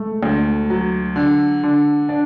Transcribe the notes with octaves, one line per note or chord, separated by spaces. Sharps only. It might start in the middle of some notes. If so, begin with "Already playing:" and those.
Already playing: G#3 A3
D2
F#3
D3
D3
D4